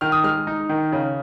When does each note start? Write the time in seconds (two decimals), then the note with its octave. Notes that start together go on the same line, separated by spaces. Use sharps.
0.01 D#3 F6
0.12 D#6
0.24 G#3 F6
0.47 D#4
0.69 D#3
0.92 C#3